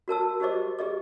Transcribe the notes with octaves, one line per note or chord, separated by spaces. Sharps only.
F#4 A#4 A5 E6
F#4 G4 C5 D#5 D6
G4 G#4 D#5 D6